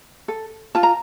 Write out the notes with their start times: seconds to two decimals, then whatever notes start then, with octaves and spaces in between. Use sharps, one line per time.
0.28 A4
0.75 F4 A5
0.83 A#5